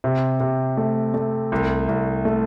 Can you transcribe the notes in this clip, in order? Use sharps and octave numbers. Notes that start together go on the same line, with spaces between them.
C3
C3
A3
A3
C2
C2
A3